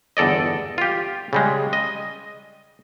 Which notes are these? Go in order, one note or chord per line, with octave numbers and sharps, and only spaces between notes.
G1 E2 A4 D5 D#5
F4 G4
C#3 G3 G#3
D#5